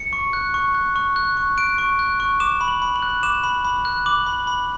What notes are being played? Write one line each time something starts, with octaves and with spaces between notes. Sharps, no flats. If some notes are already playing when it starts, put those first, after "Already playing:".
Already playing: C#7
C#6
F#6
C#6
F#6
C#6
F#6
C#6
F#6 D7
C#6
F#6
C#6
D6 E7
B5
F#7
B5
F#7
F#6
D6 E7
B5
B5
F#6
D6 F#7
B5
B5